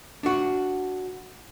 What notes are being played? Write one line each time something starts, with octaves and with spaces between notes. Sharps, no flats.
D4 F#4